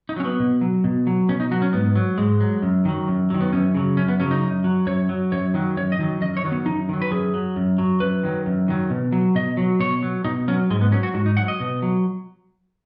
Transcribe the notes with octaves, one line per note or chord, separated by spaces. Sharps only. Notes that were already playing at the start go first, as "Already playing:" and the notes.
D#4
F#3 C#4
B3
B2
F#3
B2
F#3
B2 C#4
D#4
F#3 F#4
C#4
G#2 B3
F#3
G#2 G#3
F#3
F#2
D#3 F#3
F#2
D#3 F#3
B3
F#2 C#4
C#3 F#3
F#2 C#4
B3
C#3 F#3 C#4
D#4
F#2
F#3
F#2 C#5
F#3
F#2 C#5
D#3 F#3
F#2 C#5
D#5
D#3 F#3
F#2 D#5
C#5
D#3 F#3
B3
F#2 D#4
D#3 F#3
B4
F#2 G#4
F#3
F#2
F#3
F#2 B4
D#3 F#3
F#2
D#3 F#3
B2
F#3
B2 D#5
F#3
B2 C#5
F#3
B2 D#4
F#3 C#4
G#2 G#3
B3
F#3 C#4
F#4
G#2 F#4
D#4
F#3 F#5
D#5
B2
F#3